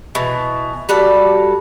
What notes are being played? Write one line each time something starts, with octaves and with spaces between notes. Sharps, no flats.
B2 E3
G3 F#4 A4 D5